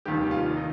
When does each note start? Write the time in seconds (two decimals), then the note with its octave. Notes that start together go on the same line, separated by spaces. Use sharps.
0.05 F1 D#2 D#3 G3 G4
0.31 F4
0.57 D#4